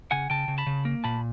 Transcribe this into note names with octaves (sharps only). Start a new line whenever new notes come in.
C#3 F#5 G#5
C#3 G5 A5
C#3
A5 B5
C#3
A#3
A#2 A5 B5